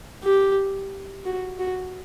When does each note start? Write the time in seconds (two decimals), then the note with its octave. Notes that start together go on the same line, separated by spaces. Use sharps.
0.23 G4
1.25 F#4
1.59 F#4